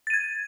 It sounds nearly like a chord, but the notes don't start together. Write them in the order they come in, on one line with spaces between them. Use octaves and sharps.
A6 D#7 G#6